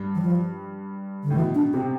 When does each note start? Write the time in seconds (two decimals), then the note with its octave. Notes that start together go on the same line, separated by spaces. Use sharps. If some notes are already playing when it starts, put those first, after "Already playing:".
Already playing: G2
0.15 E3
0.22 F3
1.24 D3
1.30 A2
1.35 B2 E3
1.55 D4
1.73 C3 C4